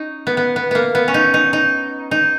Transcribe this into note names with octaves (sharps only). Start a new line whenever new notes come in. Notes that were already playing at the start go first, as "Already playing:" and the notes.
Already playing: C#4 D#4
B3
B3
B3
A#3 B3
B3
C#4
D#4
D#4
D#4
D#4